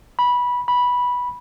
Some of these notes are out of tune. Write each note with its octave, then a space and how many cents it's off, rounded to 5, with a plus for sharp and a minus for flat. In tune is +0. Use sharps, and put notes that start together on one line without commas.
B5 -15
B5 -10